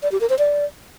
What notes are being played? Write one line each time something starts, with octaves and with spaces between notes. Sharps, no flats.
D5
G4
A#4
C5
D5